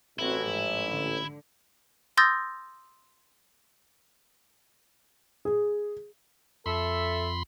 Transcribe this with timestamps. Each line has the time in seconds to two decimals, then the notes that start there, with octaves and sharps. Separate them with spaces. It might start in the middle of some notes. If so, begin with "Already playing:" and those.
0.19 A1 C4 E4 F#4
0.47 G#2 F3
0.88 D3
2.17 C6 D#6 E6 G6 A6 A#6
5.45 G#4
6.66 F2 A4 E5 B5 C6